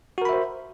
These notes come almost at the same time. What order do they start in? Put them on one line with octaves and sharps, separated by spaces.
F#4 A#4 B5 E5 C5